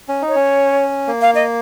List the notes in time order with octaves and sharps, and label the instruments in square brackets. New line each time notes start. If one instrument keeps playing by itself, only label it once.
[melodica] C#4
D#4
[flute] C#5
[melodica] C#4
A#3
[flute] F5
D#5